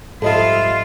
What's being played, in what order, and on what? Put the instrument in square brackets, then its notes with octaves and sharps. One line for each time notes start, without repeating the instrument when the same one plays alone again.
[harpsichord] C2 F3 E4 [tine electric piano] G#2 [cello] F4 F5 [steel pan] A4 D#5